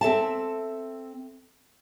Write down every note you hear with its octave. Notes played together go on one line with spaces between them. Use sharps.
C4 A4 E5 A5